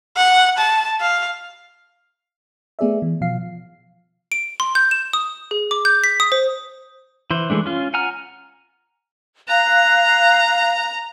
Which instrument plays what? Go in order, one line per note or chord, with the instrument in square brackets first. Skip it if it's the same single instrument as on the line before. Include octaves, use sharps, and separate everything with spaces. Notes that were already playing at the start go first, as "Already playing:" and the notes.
[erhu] F#5
A5
F5
[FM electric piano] A3 B3 G#4 D5 E5
E3
B2 F3 F5 C7
[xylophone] D7
C6
G6
E7
D#6
G#4
D6
G6
B6
D#6
C5
[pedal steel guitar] E3 C5
E3 G#3 A3 D4
C#4 F4
F#5 G#5 A#5 F6
[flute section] F5 F#6 [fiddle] A#5